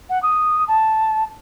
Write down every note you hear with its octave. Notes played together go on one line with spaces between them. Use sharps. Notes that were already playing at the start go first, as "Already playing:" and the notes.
F#5
D#6
A5